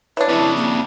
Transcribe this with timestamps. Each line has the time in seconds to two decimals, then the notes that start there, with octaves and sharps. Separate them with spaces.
0.17 E3 D4 C#5
0.29 F2 C#3 E4
0.57 A#3